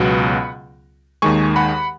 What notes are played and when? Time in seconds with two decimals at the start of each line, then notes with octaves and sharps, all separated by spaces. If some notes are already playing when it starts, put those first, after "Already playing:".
Already playing: C#2 B2 F#3 B3 F#5 B5
1.22 D#2 D#3 G#3 G#5 C#6
1.56 F#5 B5